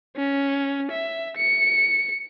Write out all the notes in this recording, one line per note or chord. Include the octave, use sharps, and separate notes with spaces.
C#4
E5
C#7